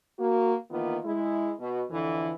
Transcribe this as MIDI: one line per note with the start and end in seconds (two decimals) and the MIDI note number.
0.19 0.53 58
0.19 0.53 66
0.71 0.98 51
0.71 0.98 52
0.71 0.98 58
0.71 0.98 59
0.71 0.98 65
1.05 1.51 56
1.05 1.51 64
1.60 1.83 47
1.92 2.33 41
1.92 2.33 50
1.92 2.33 52